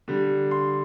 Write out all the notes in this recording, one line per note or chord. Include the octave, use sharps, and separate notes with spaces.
D3 G3
C6